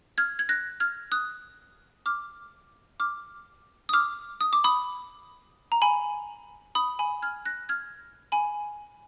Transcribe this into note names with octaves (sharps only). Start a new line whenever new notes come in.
F6 G#6
G#6
F#6 A#6
F6 G#6
D#6 F#6
D6 F6
D6 F6
D#6
D6 F6
D#6
D6
B5 D#6
A#5
G#5 B5
B5 D#6
G#5 B5
F6 G#6
F#6 A#6
F6 G#6
G#5 B5